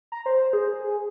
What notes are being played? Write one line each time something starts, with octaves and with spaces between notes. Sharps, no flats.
A#5
C5
G#4